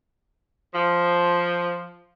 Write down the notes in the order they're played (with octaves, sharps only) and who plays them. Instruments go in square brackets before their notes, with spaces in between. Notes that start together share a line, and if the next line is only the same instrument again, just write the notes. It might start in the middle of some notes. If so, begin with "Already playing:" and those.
[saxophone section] F3